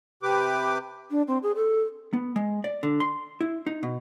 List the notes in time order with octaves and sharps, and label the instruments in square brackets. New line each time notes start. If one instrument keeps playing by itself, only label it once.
[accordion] C3 G4 B4 D6
[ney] D4
C4
G#4
A4
[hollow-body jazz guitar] B3
G#3
D5
D3
C6
E4
D#4
B2